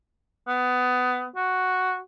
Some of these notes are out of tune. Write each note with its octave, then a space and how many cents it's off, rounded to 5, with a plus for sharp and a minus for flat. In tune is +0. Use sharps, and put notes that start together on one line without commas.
B3 +20
F#4 +0